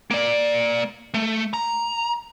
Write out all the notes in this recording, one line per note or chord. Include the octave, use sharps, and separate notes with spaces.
A#3 D5
A3
A#5